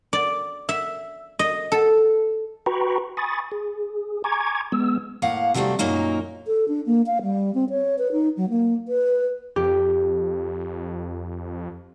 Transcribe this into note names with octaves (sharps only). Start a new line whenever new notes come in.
D5
E5
D#5
A4
F#4 B4 G5 A#5 B5 C#6
G#5 B5 C#6 D#6 A6
G#4
G#5 A#5 C#6 D6 G#6
G#3 B3 E6
A2 A#3 F5 F#5
C3 F#3 G3 A3 C4
F#2 A#2 F#3 A#3 D#4
A4
D4
A#3
F5
G3
C4
C#5
B4
D#4
F#3
A#3
B4
F2 G4